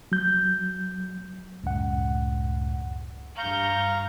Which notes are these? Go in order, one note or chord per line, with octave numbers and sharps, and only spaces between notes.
F#3 G6
C#2 F#2 A2 F#5
G2 F5 A#5 C#6 G6